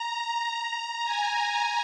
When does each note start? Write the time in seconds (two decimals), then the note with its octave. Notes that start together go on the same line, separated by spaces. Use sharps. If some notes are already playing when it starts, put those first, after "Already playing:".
Already playing: A#5
0.51 A#5
1.05 G#5